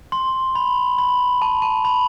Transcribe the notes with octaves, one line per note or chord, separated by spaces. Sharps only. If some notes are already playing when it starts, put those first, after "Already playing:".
C6
B5
B5
A5
A5
B5